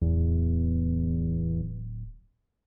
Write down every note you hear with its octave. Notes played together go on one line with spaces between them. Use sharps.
D1 E2